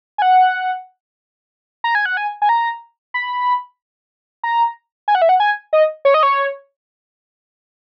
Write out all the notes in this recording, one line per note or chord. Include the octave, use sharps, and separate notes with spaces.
G#5
F#5
A#5
G#5
F#5
G#5
G#5
A#5
B5
A#5
G#5
F#5
E5
F#5
G#5
D#5
C#5
D#5
C#5